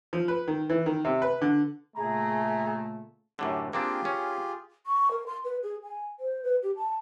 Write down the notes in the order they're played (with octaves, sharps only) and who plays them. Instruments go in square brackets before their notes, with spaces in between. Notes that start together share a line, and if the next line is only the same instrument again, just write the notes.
[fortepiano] F3
B4
D#3
E3
D#3
C3
B4
D3
[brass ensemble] A#2 C#3 A3 [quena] G#4 [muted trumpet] A#5
[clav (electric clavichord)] F#2 A2 D3 [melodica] G4
[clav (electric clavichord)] A#3 C4 D4 [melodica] F4 G4 G#4
[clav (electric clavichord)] C#4
[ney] C#6
A#4
C6
B4
G#4
G#5
C5
B4
G4
A5